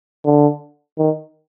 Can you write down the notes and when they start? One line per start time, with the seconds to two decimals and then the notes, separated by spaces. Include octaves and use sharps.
0.25 D3
0.98 D#3